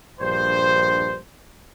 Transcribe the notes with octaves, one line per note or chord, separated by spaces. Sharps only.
A#1 G2 C5